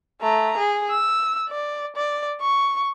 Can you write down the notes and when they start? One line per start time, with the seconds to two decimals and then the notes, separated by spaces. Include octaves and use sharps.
0.21 A3 A#5
0.57 G#4
0.90 E6
1.49 D5
1.95 D5
2.41 C#6